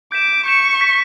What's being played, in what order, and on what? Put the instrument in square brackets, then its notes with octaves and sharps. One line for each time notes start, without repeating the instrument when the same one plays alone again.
[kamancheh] D6 [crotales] G6 B6 E7
[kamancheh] C#6 [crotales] G6 B6 E7
[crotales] G6 B6 E7